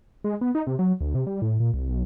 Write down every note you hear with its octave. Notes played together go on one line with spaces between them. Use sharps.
G#3
B3
D#4
C3
F#3
D2
C3
G3
A2
A#2
C2
B1